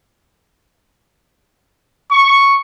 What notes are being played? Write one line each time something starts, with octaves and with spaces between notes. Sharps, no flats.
C#6